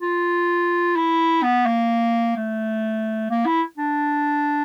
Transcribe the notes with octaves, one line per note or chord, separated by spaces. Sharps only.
F4
E4
B3
A#3
A3
A#3
E4
D4